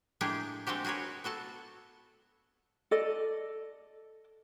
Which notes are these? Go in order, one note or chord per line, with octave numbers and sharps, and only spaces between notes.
A2 G#3 A#3 D4 G4 G#4
G#3 C4 D4 F#4 G4
F#4 G#4 A#4 B4 C#5
B3 F#4 A4 A5
A4 D5 D#5